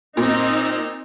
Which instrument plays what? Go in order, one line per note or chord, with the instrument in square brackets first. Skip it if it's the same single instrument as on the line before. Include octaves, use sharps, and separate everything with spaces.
[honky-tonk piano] A#2 [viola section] C4 D#4